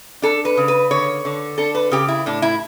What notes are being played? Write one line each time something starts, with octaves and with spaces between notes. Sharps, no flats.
D4 A4
B4
C#3
B4
D3 C#5
D3
D4 A4
B4
C#3 G4
E4
A2 D4
E4